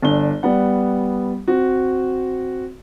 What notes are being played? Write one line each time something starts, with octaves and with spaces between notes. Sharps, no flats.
G1 D4 G7
G3 B3 F#5
C4 F#4